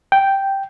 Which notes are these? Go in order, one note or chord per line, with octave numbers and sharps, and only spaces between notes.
G5